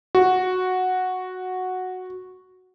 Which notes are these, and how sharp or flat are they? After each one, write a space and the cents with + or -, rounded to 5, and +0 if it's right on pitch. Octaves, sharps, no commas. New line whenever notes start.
F#4 -5